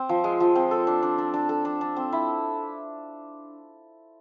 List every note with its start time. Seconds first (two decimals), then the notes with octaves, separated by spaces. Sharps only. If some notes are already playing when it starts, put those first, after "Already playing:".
Already playing: C4
0.09 F3
0.24 G#3
0.40 F3
0.55 C4
0.71 A4
0.87 D4
1.03 D4
1.18 D4
1.34 D4
1.49 A4
1.65 D4
1.81 D4
1.96 C4
2.12 E4